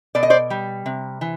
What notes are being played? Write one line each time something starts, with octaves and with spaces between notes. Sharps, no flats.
B2 D5
D#5
C5 D5
G3
C3
E3